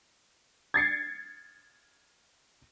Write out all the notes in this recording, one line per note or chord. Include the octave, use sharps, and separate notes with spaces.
G#6 A6 C7 C#7